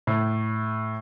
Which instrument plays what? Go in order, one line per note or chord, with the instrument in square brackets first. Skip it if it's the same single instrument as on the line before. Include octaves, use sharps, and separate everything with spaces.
[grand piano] A2